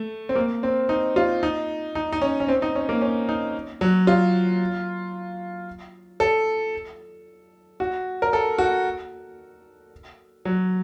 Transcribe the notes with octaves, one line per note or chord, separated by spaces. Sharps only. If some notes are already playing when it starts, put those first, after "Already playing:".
Already playing: A3
C4
A#3
C4
D#4
F4
D#4
D#4
D#4
C#4
C#4
C4
D#4
C#4
A#3
C#4
D#4
F#3
F4
A4
F#4
A#4
A4
F#4
F#3